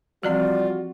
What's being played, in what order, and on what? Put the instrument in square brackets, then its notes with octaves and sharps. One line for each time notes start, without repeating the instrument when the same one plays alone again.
[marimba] E3 F3 C4 [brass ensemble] G3 F4 [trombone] F#4 [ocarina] D5